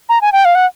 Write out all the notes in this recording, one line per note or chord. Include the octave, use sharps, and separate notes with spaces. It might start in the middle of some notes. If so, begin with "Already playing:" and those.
A#5
G#5
G5
F5
F#5